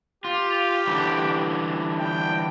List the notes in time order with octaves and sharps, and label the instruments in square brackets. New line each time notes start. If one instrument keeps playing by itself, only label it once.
[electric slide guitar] F4 [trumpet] G4
[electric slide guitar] D3 E3 G3
[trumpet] G5